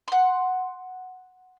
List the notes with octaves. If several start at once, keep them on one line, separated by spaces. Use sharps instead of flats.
F#5 C6